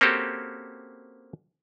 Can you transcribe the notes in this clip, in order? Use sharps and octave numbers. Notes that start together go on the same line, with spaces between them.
A#3 C4 C#4 F#4 G4 A4